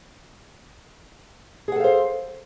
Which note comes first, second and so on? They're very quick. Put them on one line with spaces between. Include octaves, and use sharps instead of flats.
G#4 F#5 A4 F5 C5